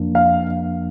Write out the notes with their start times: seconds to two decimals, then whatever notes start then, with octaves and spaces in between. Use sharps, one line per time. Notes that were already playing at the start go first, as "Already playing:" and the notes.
Already playing: F2 F3 A#3 D4
0.15 F5